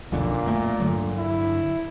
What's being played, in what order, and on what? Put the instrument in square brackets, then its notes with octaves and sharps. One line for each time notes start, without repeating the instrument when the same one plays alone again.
[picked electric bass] B1 F2 D3 [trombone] A#2
[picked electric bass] D1 A3 A#3
G2 D3 F#3
[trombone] E4